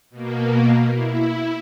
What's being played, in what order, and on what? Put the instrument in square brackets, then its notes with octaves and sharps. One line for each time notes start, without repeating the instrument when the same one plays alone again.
[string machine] B2 A#3
E4